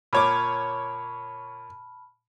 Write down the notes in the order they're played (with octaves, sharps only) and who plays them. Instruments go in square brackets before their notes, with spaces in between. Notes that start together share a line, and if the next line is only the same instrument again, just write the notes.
[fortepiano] A#2 C#5 D6 [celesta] A5 B5 F6